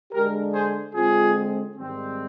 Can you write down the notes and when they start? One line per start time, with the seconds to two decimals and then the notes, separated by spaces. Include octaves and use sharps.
0.12 D3 G#3 D4 G4 A#4
0.53 G#4 C5
0.94 D3 G#3 C4 F4 G#4
1.76 G#2 D#3 G3 C4